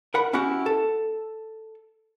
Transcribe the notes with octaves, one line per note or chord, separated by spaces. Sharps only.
A#4 F#5 B5
C#4 E4 F#4 G4 F#5
A4